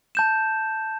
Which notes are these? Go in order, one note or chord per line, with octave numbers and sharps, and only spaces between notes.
A5 G6 E7